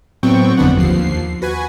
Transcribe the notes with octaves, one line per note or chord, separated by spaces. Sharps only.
A2 F#3 B3 C4 G5 C#6
G1 F2 D3 B3 D4 F#5
D#2 F3 C7
F#4 B4 G#5